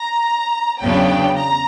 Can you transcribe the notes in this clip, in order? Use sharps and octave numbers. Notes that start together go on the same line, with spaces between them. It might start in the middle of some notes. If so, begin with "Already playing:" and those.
Already playing: A#5
E2 C#3 F#3 B3 D4 G5
A#5